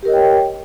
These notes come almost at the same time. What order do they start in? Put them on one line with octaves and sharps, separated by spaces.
G4 A#4 D#5 C#5 G5